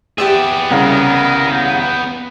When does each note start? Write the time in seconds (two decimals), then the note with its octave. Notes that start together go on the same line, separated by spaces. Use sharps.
0.18 B3 G4 G#4 D5 E5
0.71 C2 C#3 A#4
1.51 G5